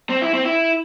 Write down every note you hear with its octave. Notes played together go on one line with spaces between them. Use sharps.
C4
E4
C4
E4